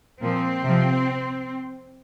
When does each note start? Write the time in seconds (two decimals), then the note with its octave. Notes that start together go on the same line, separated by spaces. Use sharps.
0.22 A#2 F3 C4
0.63 C3 F3